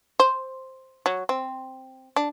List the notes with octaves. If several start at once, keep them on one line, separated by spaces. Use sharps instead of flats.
C5
F#3
C4
D4